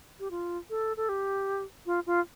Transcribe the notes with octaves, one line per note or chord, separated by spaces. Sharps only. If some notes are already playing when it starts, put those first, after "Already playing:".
G4
F4
A4
A4
G4
F4
F4